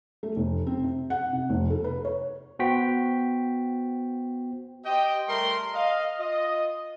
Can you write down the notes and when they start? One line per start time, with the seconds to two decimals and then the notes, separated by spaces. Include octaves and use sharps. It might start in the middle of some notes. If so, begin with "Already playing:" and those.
0.23 A3
0.36 F1
0.67 C4
0.84 C3
1.10 F#5
1.33 C3
1.49 F1
1.70 A4
1.84 B4
2.05 C#5
2.59 B3 F#4 C5 G5 B6
4.86 G4 C5 D#5 G5
5.29 G3 A3 A#4 E5 C6
5.74 D#5 F5
6.19 F4 D#5